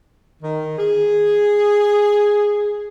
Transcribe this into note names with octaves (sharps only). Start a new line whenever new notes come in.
D#3
G#4